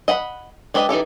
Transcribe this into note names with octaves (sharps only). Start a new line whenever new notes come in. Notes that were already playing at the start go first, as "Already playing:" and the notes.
D#5 F#5 A#5 B5
G#3 D4 G4 B4 D#5
E3 D#4 G4 A4